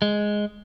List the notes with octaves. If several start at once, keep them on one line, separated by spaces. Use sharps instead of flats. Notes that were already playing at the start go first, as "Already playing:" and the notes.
G#3